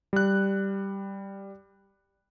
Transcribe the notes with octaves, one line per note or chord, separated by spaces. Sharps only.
G3 F#6